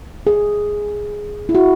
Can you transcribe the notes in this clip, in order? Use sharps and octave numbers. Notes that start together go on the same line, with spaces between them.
G#4
E4
F#4